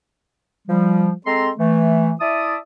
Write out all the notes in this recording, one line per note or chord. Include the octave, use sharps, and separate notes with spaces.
F3 G3
G#3 C4 A4 A#5 C6
E3 A3
E4 D5 E5 A5 D#6